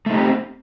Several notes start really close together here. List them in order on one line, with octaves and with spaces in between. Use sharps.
A3 D#4 G4 C4